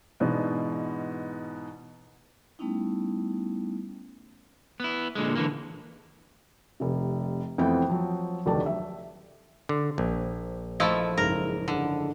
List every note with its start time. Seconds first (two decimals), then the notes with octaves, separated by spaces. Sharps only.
0.20 G#2 B2 E3 B3 D4
2.59 G3 A3 B3 C#4 D#4 E4
4.80 B3 E4
5.15 A#2 D3 G#3
5.35 D3 E3 A#3
6.80 F1 C3
7.58 F2 E3 A3 B3 C4 G5
7.89 F3 F#3
8.46 F1 D2 D#3 F#3 D5 A5
8.66 E5
9.69 D3
9.98 A#1
10.80 F3 A3 E4 D#5
11.17 F#1 G#2 A#4
11.68 D3